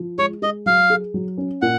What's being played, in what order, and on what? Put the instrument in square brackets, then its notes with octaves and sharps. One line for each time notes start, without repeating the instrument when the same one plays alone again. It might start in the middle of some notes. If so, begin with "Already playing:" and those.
Already playing: [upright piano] F3
[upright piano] G#3 [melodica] C#5
[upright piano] G#3 [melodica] D#5
[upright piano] F#3 [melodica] F5
[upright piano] G#4
F#3
C#4
[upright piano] A#2 [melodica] F#5